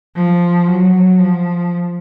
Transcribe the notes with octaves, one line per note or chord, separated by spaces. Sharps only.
F3
F#3
F3